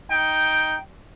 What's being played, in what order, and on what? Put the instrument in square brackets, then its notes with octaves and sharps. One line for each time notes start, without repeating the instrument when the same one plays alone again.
[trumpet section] D#4 G5